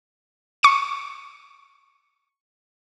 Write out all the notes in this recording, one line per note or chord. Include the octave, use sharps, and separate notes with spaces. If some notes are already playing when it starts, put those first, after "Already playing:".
C#6 C#7 D#7